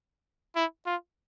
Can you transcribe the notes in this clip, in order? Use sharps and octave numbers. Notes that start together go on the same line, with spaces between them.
E4
F4